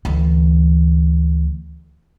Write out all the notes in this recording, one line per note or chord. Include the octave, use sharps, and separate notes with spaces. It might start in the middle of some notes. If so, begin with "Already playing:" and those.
D2 E3